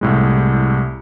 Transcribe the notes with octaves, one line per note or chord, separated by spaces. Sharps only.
C2 A2 G#3